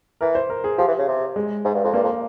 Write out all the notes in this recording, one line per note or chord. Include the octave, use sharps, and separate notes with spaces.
E3 A#4
C5
A#4
G#4
F3 G4
E3
C#3
C3
G#3
G#2
G2
F2
G2 A#3
F2